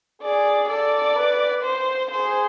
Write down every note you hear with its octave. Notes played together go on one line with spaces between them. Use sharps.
G#4 D5
A4 D5
B4
C5
G#4 C5